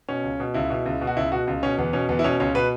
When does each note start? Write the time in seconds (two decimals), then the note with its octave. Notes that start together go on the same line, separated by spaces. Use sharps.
0.09 B2 C#4
0.24 C#2
0.40 B2
0.54 C#2 E4
0.70 B2
0.86 C#2
1.01 B2
1.07 F#4
1.16 C#2 E4
1.32 B2 F#4
1.47 C#2
1.63 B2 C#4
1.78 E2 B3
1.93 B2 C#4
2.09 E2 B3
2.19 E4
2.24 B2 C#4
2.40 C#2 C#4
2.55 B2 B4